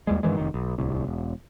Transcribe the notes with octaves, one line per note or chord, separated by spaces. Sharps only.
D#2 G3 G#3
G2 D#3 E3 G#3
F1 D#3
B1
D1 C2
E1